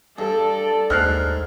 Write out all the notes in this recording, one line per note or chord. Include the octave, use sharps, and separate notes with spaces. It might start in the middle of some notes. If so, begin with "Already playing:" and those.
G2 A4 D5
D#2 G#2 F6 F#6 C7